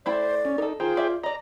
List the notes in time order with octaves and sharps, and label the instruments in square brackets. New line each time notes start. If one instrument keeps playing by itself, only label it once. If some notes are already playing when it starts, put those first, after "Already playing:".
[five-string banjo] A3 E4 G5 [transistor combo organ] C5 [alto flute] D5
[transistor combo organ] C#4
[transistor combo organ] D#4 [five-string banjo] A4 A#4
[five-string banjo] D#3 [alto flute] F4 [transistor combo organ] G#4 C5 G5
[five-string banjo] D5 E5
[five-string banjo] D5 D#5 [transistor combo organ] A#5